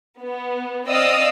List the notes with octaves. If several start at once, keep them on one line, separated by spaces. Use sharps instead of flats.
B3
C4 D5 D#5 F5 D#6 E6